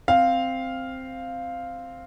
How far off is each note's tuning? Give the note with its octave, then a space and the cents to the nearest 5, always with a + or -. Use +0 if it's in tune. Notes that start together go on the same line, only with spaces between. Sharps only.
C4 +0 F5 +0